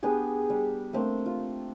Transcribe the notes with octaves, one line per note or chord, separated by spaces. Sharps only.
B3 D4 G4 G#4
G3 D4
A3 A#3 C4 D4
F4